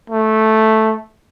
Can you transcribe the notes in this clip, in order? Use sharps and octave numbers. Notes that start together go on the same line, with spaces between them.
A3